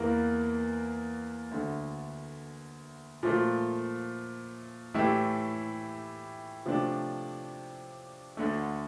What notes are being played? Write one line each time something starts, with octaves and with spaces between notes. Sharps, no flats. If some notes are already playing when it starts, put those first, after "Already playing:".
Already playing: E2 E3 A#3
D2 D3 A3
A#2 F3 A3
A2 E3 A3 E4 G4
C3 F3 A3 D4
D2 D3 A3